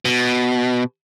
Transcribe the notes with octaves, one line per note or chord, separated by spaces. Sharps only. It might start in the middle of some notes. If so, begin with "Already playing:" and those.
B2